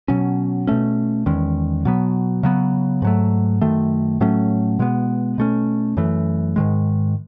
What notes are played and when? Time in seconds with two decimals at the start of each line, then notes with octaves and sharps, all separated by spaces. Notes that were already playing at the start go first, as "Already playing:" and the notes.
0.08 B2 F#3 C#4
0.67 B2 A3 C#4
1.26 E2 D#3 G#3 C#4
1.85 B2 F#3 B3
2.43 C#3 F#3 B3
3.02 G#2 F#3 A3
3.61 F#2 D#3 A3
4.20 A2 F#3 A3 C#4
4.79 B2 G#3 B3
5.38 B2 A3 C#4
5.97 F#2 E3 A3
6.56 G#2 D#3 G#3